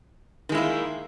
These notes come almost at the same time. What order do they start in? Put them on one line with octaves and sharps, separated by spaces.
D#3 G#3 E4 A#3